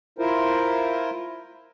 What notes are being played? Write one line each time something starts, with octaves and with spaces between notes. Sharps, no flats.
E4 F4 A#4 C5